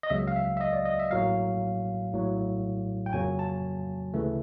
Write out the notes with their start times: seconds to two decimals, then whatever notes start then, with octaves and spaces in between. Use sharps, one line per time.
0.03 D#5
0.10 C#2 C#3 F#3 A#3 E5
0.28 F5
0.36 E5
0.57 E5
0.61 D#5
0.73 D5
0.85 D#5
0.99 E5
1.11 A1 A2 F#3 A#3 F5
2.13 A#1 A2 F#3
3.06 G5
3.13 F2 C#3 F#3 A#3 G#5
3.39 A5
4.14 D2 C#3 E3 A3